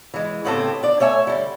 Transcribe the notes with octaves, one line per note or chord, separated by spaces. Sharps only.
E3 G#3
A2 C#3 B3 C4 G4 A4
D4 D5
A3 C#5 E5 G#5
D3 G3